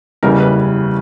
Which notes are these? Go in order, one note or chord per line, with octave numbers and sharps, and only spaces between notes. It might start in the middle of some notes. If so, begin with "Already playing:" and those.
F#1 E2 C#3 E3 G3 A#4
B4